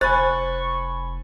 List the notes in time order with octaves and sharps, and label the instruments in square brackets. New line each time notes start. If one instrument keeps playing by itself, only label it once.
[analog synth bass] F1 [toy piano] C5 [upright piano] G#5 B5 A6 [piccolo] C#6